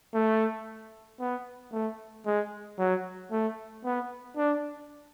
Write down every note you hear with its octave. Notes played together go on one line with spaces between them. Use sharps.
A3
B3
A3
G#3
F#3
A3
B3
D4